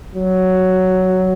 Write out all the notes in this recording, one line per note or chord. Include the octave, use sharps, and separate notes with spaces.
F#3